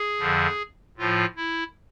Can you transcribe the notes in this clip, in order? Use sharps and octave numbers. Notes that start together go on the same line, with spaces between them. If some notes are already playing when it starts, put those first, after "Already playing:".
Already playing: G#4
F2 D3 F3
A2 F3 F4
E4